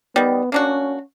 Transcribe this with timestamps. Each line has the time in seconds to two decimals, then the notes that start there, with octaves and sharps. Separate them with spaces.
0.16 D#3 G3 B3
0.52 A#3 C#4 D4 F#4